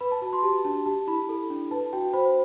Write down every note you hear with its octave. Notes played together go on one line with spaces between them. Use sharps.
B4 B5
A5
F#4 A5
C6
G4 A5
D4 A5
G4 A5
E4 B5
A4
D4
B4 A5
F#4 G5
C5 B5